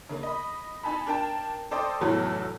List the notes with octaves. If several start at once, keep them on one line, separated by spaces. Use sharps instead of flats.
C#3 A#3
D#5 B5
D#4 G#5 A5 B5
D4 A#4 G5 A5
A4 C5 D5 D#5 G5
F1 E2 A2 F#3 F#4 A4